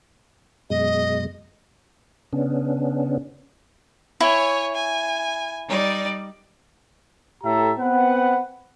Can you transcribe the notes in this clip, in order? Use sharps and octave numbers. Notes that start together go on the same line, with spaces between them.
F#2 B2 G#3 D#5
C#3 B3 C#4 D4
E4 C#5 G#5
G#5
G3 D#4 D5
A2 G4 A4 E5 A#5
B3 C4 B4 F#5